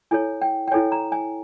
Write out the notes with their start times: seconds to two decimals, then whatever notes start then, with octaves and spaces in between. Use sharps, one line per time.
0.11 E4 A4 C#5 G#5
0.42 G5
0.68 G5
0.72 E4 A4 C#5 G#5
0.92 A#5
1.12 G#5